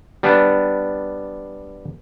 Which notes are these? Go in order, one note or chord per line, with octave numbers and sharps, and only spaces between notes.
G3 B3 D4